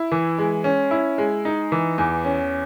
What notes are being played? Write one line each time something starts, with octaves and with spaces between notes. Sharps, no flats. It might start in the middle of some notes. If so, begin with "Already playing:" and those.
Already playing: E4
E3
G#3
C#4
E4
G#3
D#4
E3
E2
C#4